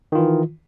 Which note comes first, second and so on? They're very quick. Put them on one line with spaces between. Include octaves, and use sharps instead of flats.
D#3 F4 E3